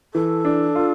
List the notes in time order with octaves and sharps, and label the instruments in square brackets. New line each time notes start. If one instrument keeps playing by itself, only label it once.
[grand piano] E3 [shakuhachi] A4
[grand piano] D4
F4